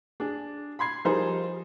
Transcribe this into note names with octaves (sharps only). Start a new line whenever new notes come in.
D4 G#4
B5 C6 G#6 C7
F3 G3 D#4 G#4 A#4 C5